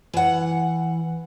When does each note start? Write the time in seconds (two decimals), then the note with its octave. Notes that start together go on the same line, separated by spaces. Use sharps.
0.13 E3 F#5